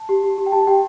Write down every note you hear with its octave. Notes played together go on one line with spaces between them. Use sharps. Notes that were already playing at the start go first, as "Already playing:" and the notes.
Already playing: A5
G4
G4
G4
G5
G4 A5
G4 G5